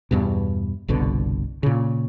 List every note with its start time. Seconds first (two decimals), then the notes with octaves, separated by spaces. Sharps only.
0.11 E2 G2 B2
0.88 G1 C2 B2 D3
1.63 A#2 C#3